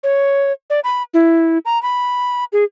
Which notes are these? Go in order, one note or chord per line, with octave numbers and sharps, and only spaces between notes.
C#5
D5
B5
E4
A#5
B5
G#4